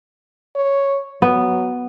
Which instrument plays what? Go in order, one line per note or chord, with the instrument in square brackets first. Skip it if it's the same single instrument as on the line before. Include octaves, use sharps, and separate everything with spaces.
[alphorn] C#5
[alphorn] F#3 [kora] B3